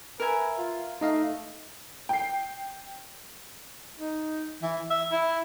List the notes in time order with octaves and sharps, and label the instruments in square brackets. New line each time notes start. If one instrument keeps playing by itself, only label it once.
[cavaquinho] A#4 E5 G#5 [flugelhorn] B4
[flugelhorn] F4
[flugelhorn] A3 [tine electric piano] D#4 D#5 F5
[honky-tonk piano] G5 C7
[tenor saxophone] D#4
E3
E5
E4